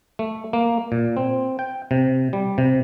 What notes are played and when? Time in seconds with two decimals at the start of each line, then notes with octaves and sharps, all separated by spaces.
0.19 A3
0.53 A#3
0.92 A#2
1.17 C4
1.59 G5
1.91 C3
2.33 G3
2.58 C3